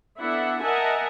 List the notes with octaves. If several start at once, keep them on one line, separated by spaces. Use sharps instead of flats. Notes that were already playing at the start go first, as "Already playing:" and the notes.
B3 D4 E4 A4 F#5
A#4 D#5 E5 F#5 G#5 A5